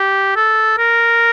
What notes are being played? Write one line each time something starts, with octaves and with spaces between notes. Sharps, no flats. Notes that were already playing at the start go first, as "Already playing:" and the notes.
Already playing: G4
A4
A#4